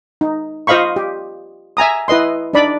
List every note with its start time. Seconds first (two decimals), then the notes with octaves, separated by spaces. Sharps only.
0.21 D#4
0.67 F4 C5 D#5 F5 B5 C#6
0.96 G4
1.77 E5 G#5 A#5 D#6
2.08 E4 B4 D#5 C6
2.53 D4 D#4 D5 B5